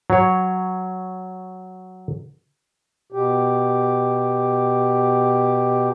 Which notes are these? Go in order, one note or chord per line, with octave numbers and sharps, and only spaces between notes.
F#3 C#5
B2 G4